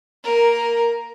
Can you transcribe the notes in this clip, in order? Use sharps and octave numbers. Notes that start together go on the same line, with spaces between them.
A#3 A#4